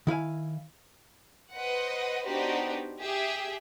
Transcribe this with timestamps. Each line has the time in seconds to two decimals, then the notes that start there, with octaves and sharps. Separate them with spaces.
0.07 D#3 E4 F5 G#5
1.55 B4 C5 D#5 F#5
2.26 B3 D4 D#4 F#4 G4 C5
3.01 G4 G#4 E5